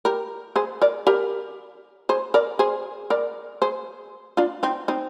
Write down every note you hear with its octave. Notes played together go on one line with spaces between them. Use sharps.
G4 A#4
G#4 C5
A#4 D5
G4 A#4
G#4 C5
A#4 D5
G#4 C5
A#4 D5
G#4 C5
D4 F4
C4 D#4
C4 D#4